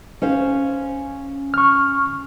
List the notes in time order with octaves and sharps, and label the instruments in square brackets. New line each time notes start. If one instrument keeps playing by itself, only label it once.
[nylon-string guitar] C#4 C5 F5
[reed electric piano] C#6 F6